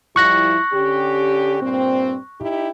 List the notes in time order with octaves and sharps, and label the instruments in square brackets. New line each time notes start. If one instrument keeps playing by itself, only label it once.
[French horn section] F3 G3 E4 [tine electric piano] C#6 F#6 A#6
[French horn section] D3 C#4 G4
G2 A#2 C4
D#4 E4 G4